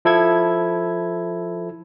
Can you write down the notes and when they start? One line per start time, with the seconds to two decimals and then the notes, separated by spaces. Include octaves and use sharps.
0.05 F3 E4 A4 G#6